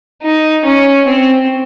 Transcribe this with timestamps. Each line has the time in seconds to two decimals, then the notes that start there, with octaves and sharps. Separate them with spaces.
0.23 D#4
0.65 C#4
1.08 C4